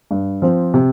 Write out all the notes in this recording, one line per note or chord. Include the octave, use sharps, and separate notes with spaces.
G2
F3 C4
C3